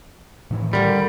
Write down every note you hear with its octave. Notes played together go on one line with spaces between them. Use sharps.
A2 D#3 E3
D3 G3 A#4